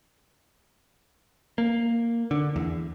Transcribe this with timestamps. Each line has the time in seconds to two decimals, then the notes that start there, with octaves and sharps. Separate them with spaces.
1.58 A#3
2.31 D3
2.56 E2